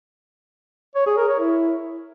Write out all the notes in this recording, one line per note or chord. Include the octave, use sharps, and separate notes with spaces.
C#5
G#4
A#4
C#5
E4